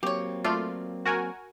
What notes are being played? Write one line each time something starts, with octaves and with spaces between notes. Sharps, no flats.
F#3 A#3 C4 G4 C#5
A3 F4 D5
F#4 A#4 G#5